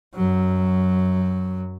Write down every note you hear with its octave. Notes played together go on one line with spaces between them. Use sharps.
F#2 F#3